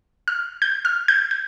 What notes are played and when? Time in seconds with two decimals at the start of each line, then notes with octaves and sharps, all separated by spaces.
0.28 F6
0.62 G6
0.85 F6
1.08 G6
1.31 G6